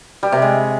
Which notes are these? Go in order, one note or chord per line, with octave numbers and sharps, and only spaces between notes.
G3
C3
G#3